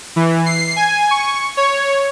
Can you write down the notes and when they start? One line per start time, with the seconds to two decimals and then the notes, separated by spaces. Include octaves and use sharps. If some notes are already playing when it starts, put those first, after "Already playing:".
0.16 E3
0.46 C7
0.76 G#5
1.11 C#6
1.57 C#5